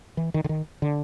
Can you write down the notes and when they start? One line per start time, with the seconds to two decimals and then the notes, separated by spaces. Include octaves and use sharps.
0.17 E3
0.34 D#3
0.44 D3
0.49 D#3
0.82 D3